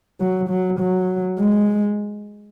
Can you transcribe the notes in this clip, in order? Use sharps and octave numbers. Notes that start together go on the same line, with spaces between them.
F#3
F#3
F#3
G#3